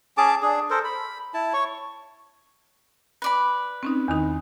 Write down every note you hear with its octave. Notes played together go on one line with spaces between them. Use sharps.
C#4 G#4 A5 D6
D4 G#4
A4 A#4 C5
B5
E4 A5
C#5 C#6
B4 D5 B5
C4 C#4 D#4
E2 D#3 D#4